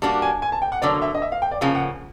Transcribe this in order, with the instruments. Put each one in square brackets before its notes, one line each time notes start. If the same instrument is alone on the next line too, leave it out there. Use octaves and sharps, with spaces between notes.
[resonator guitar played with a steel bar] G3 A#3 D4 F#4 [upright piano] A5
[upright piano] G#5
G#5
A5
G5
F#5
[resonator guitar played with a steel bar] D3 F#3 A#3 [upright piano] D5
[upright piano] E5
D#5
E5
F5
G5
D5
[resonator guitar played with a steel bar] C#3 F3 A#3 [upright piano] F5
[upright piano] F#5